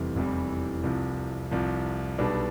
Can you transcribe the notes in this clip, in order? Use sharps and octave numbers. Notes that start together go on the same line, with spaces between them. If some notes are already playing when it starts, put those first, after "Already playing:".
Already playing: F1 E2 C3 E3 G3 C4 E4
F1 E2 C3 E3 G3
C2 C3 F3
C2 C3 F3
B1 B2 G3 B3 D4